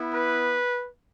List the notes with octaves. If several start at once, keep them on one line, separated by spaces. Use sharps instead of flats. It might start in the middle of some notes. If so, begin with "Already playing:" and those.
Already playing: B3 E4
B4